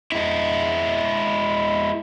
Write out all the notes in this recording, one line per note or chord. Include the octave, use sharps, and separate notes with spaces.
G#3 E4